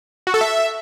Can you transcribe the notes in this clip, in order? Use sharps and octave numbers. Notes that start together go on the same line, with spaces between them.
F#4
A4
E5